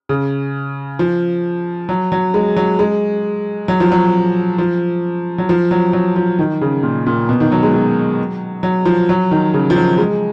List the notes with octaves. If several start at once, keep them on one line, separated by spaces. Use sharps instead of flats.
C#3
F3
F#3
F#3
G#3
F#3
G#3
F#3
F3
F#3
F3
F#3
F3
F#3
F#3
F3
D#3
C#3
A#2
A#2
B2
D#3
F#3
G#3
F#3
F#3
F3
F#3
D#3
C#3
F3
F#3
G#3